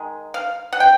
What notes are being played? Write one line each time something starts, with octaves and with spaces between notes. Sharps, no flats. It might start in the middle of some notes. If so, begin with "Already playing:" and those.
Already playing: D#3 G#3
F5
F#5
G5